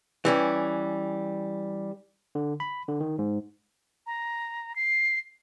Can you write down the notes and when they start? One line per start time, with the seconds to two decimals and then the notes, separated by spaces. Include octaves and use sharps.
0.25 E3 G3 C#4
2.35 D3
2.60 B5
2.89 D3
3.01 D#3
3.19 G#2
4.07 A#5
4.76 C7